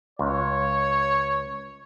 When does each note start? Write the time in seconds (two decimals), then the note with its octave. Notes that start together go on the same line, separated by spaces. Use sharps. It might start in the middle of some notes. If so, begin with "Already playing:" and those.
0.19 C#2 C#5